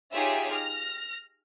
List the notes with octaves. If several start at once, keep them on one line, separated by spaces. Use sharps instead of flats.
D#4 F4 G4 G#4 C#5 E5
F6 A#6